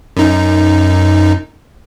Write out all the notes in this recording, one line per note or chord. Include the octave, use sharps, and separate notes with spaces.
F#2 D#4